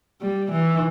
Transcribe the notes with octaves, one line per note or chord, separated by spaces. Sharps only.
G3
E3